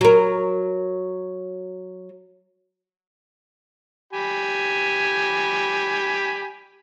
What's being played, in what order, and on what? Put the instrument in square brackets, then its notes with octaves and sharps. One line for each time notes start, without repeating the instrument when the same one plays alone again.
[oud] F#3 A#4
[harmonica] G4 G#5 B5